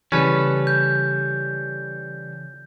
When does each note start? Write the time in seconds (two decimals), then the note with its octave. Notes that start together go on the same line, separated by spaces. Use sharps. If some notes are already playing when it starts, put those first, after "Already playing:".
0.12 C#3 E3 G3 C#4 A4 B4
0.67 G6